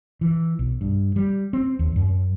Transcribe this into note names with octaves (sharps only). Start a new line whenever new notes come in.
E3
B1
G2
G3
C4
D#2
F#2